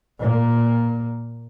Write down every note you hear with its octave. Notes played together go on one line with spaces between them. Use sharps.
A#2 A#3